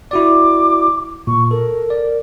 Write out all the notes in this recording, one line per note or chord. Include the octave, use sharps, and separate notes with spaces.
E4 F#4 D5 D6
A#2 C#6
A4 A#4
D5